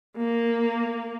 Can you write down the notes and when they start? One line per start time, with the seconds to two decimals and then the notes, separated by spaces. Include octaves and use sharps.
0.17 A#3